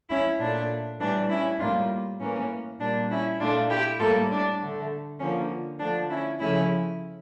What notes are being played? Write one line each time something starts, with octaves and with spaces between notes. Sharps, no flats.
C#4 E4
A#2 A3 D4
A2 E3 G3 D4
C#4 E4
A2 G3 A#3 D4 F4
A2 E3 A#3 C#4
A#2 G3 A#3 D4
C#4 E4
A#2 A3 D4 F4
E4 G4
A2 G3 A#3 F4 A4
D4
D3 A3
D3 F3 A#3 C#4
D3 F3 A3 D4
C#4 E4
C#3 F3 A3 C#4 E4